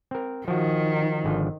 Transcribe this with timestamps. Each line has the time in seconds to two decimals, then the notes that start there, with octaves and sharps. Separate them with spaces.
0.11 C4 A#4
0.48 D#3 F3 F#4
1.24 G#1 D3 F3